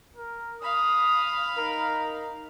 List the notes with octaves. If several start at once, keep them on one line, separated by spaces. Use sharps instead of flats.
A#4
F5 B5 D#6
D#4 A#4